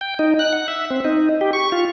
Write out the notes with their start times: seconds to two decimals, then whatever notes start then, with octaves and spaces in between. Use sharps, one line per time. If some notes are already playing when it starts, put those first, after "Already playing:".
0.01 G5
0.19 D#4
0.39 F#6
0.53 F#5
0.68 E5
0.91 C4
1.05 D#4
1.41 G4
1.53 C#6
1.72 F4